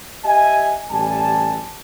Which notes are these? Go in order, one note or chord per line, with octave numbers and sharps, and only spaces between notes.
G4 D#5 E5 G#5
A1 G3 G#5 A5